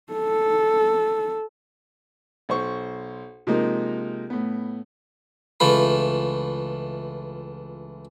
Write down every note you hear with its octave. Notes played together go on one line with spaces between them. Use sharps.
A4
B1 C5 C#6
C3 F3 G#3 A#3 D#4 A#4
A2 B3
C#2 E3 A3 F4 B5